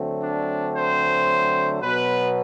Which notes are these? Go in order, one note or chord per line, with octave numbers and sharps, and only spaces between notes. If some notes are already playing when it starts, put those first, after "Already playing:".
Already playing: D3 F#3 A3 C4
D4
C5
B2 F#3 B3 B4